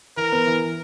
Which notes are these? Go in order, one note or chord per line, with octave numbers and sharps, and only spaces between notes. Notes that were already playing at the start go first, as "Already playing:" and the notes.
E3 A#4
B3
E3